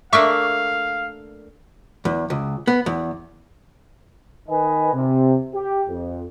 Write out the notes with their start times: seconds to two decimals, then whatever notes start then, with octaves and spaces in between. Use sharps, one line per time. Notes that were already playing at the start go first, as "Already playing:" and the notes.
0.13 A3 A#3 D4 E5 F5 C#6
2.05 E2
2.30 C#2
2.67 B3
2.86 E2
4.49 D#3 B4 D#5 G#5
4.93 C3
5.55 G4
5.89 F2